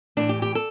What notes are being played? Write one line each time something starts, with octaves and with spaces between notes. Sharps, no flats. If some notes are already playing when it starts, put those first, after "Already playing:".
A2 E3 D4
G4
G4
A4